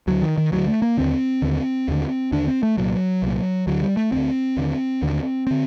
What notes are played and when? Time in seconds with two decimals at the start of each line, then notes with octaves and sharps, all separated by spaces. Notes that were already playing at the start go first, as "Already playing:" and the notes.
0.07 D2 D3 F#3
0.22 D#3
0.38 D#3
0.52 D2 D3 F#3
0.68 A3
0.82 A#3
0.97 D#2 D3 C4
1.42 D#2 D3
1.88 D#2 D3
2.32 D#2 D3 D4
2.48 C4
2.63 A3
2.77 C2 A#2 F#3
3.22 C2 A#2
3.67 D2 D3 F#3
3.83 G3
3.97 A3
4.12 D2 D3 C4
4.57 D#2 D3
5.02 D#2 D3
5.47 D3 C4